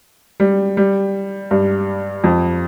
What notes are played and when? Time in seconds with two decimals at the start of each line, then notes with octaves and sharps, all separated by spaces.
0.40 G3
0.77 G3
1.51 G2
2.24 F2